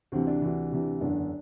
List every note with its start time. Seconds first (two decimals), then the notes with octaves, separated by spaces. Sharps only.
0.12 D2 C3 E3 C4
0.27 D4
0.42 D2 C3 E3
0.72 D2 C3 E3
1.01 F#1 E2 D3 D4